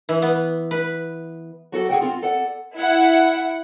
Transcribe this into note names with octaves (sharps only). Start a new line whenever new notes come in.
E3
B3
B4
F#3 F#4 A4 D5
G#4 A4 F#5 G5
C4 F4
A4 D5 F#5
E4 F#5